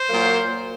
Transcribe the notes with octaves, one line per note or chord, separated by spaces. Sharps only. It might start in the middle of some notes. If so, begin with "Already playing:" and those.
Already playing: C5
A#2 F#3 A#3